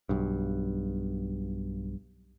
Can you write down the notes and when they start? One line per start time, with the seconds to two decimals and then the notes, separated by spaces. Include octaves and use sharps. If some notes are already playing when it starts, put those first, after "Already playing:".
0.09 B1 G2